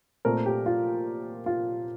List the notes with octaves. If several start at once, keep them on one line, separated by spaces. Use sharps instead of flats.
A#2 A3 C4 A#4
G4
F4
F4